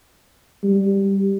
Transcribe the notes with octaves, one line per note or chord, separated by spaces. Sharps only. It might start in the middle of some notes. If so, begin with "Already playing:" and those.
G3